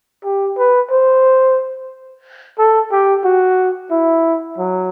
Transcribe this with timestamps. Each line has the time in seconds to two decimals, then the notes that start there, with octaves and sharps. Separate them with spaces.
0.25 G4
0.58 B4
0.91 C5
2.58 A4
2.92 G4
3.24 F#4
3.91 E4
4.58 F#3